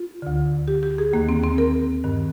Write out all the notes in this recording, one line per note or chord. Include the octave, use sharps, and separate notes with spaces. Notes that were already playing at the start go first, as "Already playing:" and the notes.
Already playing: F4
D2 D3
G4
G4
G#4
D#2 D#3 A#3
C4
C4
A#4
G2 D#3